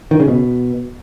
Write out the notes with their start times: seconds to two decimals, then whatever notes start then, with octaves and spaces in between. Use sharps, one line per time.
0.11 D#3
0.20 C#3
0.28 B2